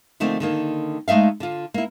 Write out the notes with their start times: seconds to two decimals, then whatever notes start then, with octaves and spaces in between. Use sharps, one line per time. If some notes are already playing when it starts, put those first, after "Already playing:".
0.20 D3 F3 A3 A#3 C4 D#4
0.40 D3 D#3 A#3
1.08 G#3 A3 D#4 E5 F5
1.40 D3 F4
1.74 A#3 E4